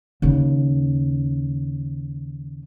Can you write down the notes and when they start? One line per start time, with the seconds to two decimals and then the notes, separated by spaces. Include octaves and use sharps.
0.22 D#2 C#3